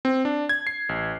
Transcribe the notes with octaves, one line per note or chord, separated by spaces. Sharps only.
C4
D4
G#6
C7
A1